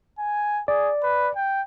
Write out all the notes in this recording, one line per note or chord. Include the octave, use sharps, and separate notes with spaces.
G#5
G#4 D5
B4
G5